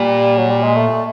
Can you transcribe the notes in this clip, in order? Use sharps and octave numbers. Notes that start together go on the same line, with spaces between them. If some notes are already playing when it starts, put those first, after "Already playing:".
Already playing: A#2 G3
F#3
G3
G#3
A3